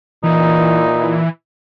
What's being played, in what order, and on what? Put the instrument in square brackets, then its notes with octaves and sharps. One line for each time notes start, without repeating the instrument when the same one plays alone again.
[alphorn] A#2 [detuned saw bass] E3 [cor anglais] D#4